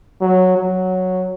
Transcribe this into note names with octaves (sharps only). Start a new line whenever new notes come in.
F#3
F#3